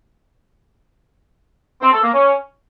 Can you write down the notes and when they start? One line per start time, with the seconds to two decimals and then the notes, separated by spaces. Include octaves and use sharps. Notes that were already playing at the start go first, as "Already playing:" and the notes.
1.82 C4
1.93 A4
2.03 A#3
2.14 C#4